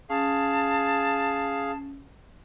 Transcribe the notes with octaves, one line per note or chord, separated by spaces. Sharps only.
C#4 G#4 F5 A5